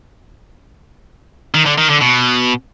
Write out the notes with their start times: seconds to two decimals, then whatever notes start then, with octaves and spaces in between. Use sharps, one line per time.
1.54 D#3
1.66 D3
1.78 D#3
1.89 D3
2.01 B2